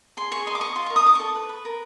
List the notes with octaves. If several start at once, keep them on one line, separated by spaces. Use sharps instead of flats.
G#4 C6
G#4 C#6
D#5 C6
D6
D#5 C#6
F4 C6
A#4 C#6
D#6
D#4 D6
C#6
A4
B4
B4
A#4